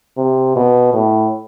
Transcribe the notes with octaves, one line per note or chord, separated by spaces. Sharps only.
C3
B2
A2